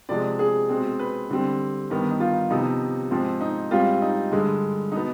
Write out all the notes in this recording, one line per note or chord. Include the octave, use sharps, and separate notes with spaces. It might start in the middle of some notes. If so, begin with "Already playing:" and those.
C3 F3 G#3 D5
G#4
B2 G#3 C4
B4
D3 G3 C4
G2 D#3 B3
D#4
F4
C3 F3 B3 D#4
G#2 F3 C4
D#4
G#2 G3 C4 F4
D#4
G2 D3 G#3
B2 B3 D#4